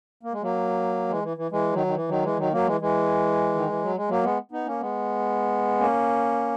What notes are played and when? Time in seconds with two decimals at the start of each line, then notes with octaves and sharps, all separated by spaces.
0.23 A#3
0.32 G#3
0.42 F#3 A#3
1.08 E3 G#3
1.23 E3
1.37 E3
1.51 E3 G#3
1.73 D#3 F#3
1.86 D#3
1.95 E3
2.08 D#3 F#3
2.23 E3 G#3
2.37 D#3 F#3
2.52 F#3 A#3
2.66 E3 G#3
2.80 E3 G#3
3.55 D#3
3.69 E3
3.82 F#3
3.96 G#3
4.09 F#3 A#3
4.23 G#3 B3
4.52 B3 D#4
4.66 A#3 C#4
4.80 G#3 B3
5.80 A#3 C#4